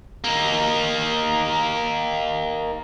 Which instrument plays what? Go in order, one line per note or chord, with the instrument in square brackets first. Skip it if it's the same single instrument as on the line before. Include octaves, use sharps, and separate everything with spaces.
[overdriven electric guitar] A#3 D#4